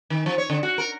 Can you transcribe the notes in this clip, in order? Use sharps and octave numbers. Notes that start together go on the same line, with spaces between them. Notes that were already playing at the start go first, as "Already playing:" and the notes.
D#3
F3
C#5
D3
F#4
A#4